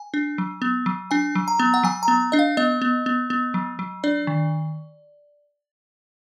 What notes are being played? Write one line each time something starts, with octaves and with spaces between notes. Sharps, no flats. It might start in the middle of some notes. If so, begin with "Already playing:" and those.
Already playing: G#5
D4
F#3
B3
F#3
D4 G#5
F#3
A#5
B3
F#5
F#3 G#5
A#5
B3
D4 D#5
F5
B3 D#5
B3
B3
B3
F#3
F#3
D4 D5
D#3